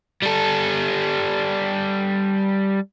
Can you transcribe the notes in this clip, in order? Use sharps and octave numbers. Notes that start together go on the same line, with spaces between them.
G3 A4